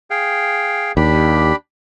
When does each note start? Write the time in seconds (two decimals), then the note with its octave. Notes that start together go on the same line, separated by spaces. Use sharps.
0.10 G#4 F5 G5
0.97 D#2 D4 G4 B5